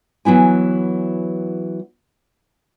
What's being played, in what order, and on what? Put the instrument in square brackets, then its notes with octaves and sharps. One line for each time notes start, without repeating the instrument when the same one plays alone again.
[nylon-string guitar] E3 F#3 B3 E4 G#5